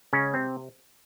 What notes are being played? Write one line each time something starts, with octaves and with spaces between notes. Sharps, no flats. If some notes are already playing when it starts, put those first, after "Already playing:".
C#3 G#3 C#4
C3 C4